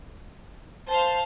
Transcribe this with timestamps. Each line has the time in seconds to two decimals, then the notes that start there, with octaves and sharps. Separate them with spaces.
0.88 C5 F5 A5